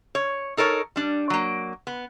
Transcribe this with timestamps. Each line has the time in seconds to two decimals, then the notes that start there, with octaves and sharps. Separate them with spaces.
0.15 C#5
0.57 D#4 A4 A#4 C#5
0.96 G3 D4
1.30 F#3 A#3
1.87 B3